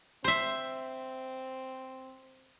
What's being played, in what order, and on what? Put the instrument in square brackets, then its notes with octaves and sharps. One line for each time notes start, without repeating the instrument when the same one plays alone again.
[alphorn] C4 [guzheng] C5 E5